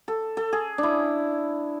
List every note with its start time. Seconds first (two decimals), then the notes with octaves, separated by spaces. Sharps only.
0.08 A4
0.37 A4
0.53 G#4
0.78 D4
0.83 E4